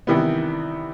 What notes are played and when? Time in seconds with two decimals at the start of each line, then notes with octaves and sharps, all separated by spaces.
0.07 C3 D#3 E3 G3 B3